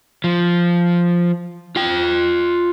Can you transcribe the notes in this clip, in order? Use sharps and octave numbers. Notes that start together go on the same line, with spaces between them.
F3
F4 G5